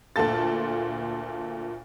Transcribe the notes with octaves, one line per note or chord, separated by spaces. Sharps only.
D2 A#2 F4 A4 A6